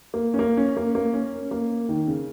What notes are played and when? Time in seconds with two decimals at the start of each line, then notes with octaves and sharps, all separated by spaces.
0.14 A#3
0.34 C#4
0.39 A#3
0.57 C#4
0.77 A#3
0.95 A#3
1.14 C#4
1.51 A#3
1.89 D#3
2.07 C#3